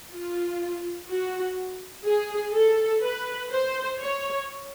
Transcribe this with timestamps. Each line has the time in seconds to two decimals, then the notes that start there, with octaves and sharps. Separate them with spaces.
0.12 F4
1.09 F#4
2.06 G#4
2.54 A4
3.03 B4
3.52 C5
4.01 C#5